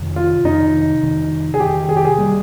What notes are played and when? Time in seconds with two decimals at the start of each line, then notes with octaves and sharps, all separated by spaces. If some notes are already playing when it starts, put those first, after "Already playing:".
Already playing: F2 C3 D#3
0.16 F4
0.44 F2 C3 D#3 D#4
1.03 F2 C3 D#3
1.54 G#4
1.59 F2 C3 D#3 G4
1.89 G#4
1.97 G4
2.05 G#4
2.18 G3 A#3